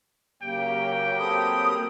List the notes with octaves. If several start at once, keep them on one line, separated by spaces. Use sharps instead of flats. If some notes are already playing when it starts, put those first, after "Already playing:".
C#3 F#3 A#3 G4 G5
C4 A4 B5 D#6